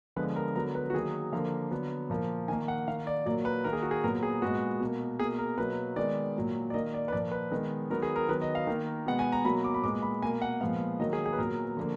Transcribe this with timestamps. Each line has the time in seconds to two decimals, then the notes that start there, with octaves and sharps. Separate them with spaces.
0.16 D3 F3 G#3 B3 B4
0.36 A#4
0.55 D3 F#3 B3 A#4
0.75 B4
0.90 F#4
0.93 D#3 F#3 A#3 G#4
1.32 D3 F3 A#3 F5
1.71 D3 F#3 B3
2.10 A#2 F3 A#3
2.48 D#3 G#5
2.52 A#3
2.68 F#5
2.88 D#3 F5
2.91 A#3
3.07 D5
3.26 A#2 F#3 A#3 D5
3.45 B4
3.64 D#3 A#3 A#4
3.73 G#4
3.82 F#4
3.91 G#4
4.04 A#2 F#3 B3 A#4
4.23 G#4
4.42 A#2 G#3 B3 F#4
4.80 B2 A#3
5.19 B2 A#3 G#4
5.39 A#4
5.58 B2 F#3 A#3 B4
5.96 D#3 G#3 B3 D5
6.36 A#2 F#3 A#3
6.70 D5
6.74 D#3 A#3 D#5
6.94 D5
7.08 B4
7.12 A#2 F3 A#3 D5
7.32 B4
7.51 D#3 G#3 B3
7.90 D#3 F#3 B3 A#4
8.03 G#4
8.16 A#4
8.29 D#3 F#3 B3 B4
8.42 D#5
8.55 F5
8.67 D#3 A#3
9.06 B2 G#3 B3 F#5
9.19 G#5
9.32 A#5
9.44 B2 F#3 A#3 B5
9.64 D6
9.74 B5
9.83 A#2 G#3 B3 D6
10.02 B5
10.22 B2 G#5
10.26 A#3
10.42 F#5
10.61 A#2 F3 G#3 B3 F5
11.00 D#3 F#3 A#3 D#5
11.13 G#4
11.26 G#4
11.33 B4
11.38 A#2 F#3 B3 A#4
11.77 D3 F3 A#3